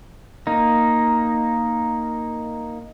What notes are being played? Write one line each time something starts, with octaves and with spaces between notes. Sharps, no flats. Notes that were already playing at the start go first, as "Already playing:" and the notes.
A#3 D#4